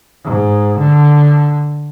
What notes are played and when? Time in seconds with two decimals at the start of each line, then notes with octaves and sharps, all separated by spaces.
0.24 G#2
0.78 D3